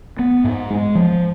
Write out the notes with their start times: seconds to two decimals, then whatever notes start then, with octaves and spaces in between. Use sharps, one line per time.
0.19 B3
0.44 G#2
0.70 G#3
0.95 F3